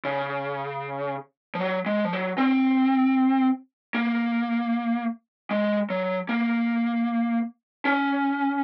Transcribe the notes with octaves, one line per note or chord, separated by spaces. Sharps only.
C#3
F3
F#3
G#3
F3
F#3
C4
A#3
G#3
F#3
A#3
C#4